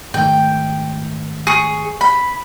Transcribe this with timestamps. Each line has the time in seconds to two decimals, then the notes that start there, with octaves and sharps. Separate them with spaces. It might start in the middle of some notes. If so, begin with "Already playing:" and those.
0.14 G#2 D#3 A3 G5
1.47 G#4 C#6
2.01 B5